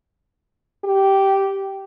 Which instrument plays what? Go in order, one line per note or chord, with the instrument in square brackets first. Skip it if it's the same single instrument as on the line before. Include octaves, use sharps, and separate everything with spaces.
[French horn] G4